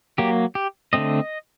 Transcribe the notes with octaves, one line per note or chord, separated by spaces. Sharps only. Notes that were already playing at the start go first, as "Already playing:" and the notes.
F#3 A#3 G4
G4
D3 A3 C4 D#5